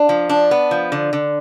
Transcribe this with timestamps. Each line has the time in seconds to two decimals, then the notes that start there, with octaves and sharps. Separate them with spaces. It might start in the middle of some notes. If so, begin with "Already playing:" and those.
Already playing: D4
0.09 F3
0.29 D4
0.51 B3
0.71 F3
0.92 D3
1.13 D3